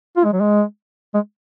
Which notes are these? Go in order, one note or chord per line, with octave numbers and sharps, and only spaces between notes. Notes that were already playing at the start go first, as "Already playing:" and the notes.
F4
G#3
F#3
G#3
G#3